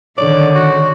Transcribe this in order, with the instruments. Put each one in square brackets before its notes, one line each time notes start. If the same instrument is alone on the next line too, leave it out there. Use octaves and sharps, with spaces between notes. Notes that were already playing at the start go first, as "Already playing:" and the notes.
[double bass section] D3 [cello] D#3 [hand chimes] C#5 [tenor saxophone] D5
[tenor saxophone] F#4